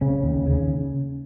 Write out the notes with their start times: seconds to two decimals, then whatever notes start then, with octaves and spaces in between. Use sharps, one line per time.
0.01 C#3 C#4
0.24 D#2
0.46 C#3